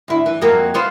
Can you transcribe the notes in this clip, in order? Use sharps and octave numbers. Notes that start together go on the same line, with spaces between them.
D2 E4
E3
F2 F#3 A#3
B3 F4 C5